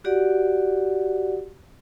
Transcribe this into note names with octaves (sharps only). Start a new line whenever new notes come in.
F#4 G4 D5 F#5